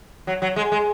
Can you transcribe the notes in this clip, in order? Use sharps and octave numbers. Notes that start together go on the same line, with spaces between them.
F#3
F#3
G#3
G#3